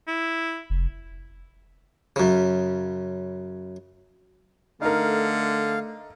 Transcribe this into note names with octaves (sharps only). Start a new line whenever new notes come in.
E4
F1
F#2 C#3
D3 A3 D#4 A#4 F5